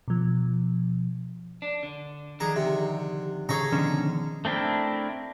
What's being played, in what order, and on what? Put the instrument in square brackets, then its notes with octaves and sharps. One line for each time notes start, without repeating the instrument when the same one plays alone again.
[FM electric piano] B2 F3
[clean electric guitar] D4
D3
[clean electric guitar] D3 D#3 F3 [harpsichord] G#4 A#5
[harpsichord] C3
[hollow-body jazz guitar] C#3 C#5 [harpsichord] G#4 A4 A#5
[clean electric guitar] B2 F3 [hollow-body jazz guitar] D3 D#3 C#4
[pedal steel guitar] A3 C4 D4 E4 A#4